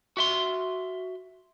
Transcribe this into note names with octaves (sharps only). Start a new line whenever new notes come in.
F#4 E5 C6